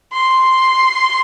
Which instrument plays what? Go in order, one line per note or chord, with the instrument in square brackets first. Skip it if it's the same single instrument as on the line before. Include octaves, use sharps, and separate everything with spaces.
[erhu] C6